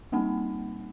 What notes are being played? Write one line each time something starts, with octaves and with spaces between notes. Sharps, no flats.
G3 A#3 C4 D#4